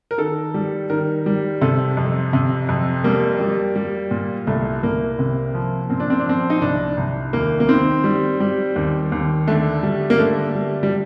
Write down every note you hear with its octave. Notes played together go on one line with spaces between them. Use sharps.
A#4
D#3 A4
G3
D#3 A#4
G3
C3 A4
F2
C3
F2
G3 A#3
G3
G3
A#2
C2 A3
C2 A#3
C3
F3
A#2 C4
D4
C4
D4
F3 C4
D#4
C2 D4
C2
D#2 A#3
A#3
D#3 C4
G3
G3
D#2
D#2
D3 A3
G3
A#3
D3 A3
G3
G3